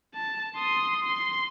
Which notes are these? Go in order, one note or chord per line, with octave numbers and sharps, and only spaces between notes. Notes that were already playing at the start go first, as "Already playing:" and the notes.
A5
C6 D#6
C6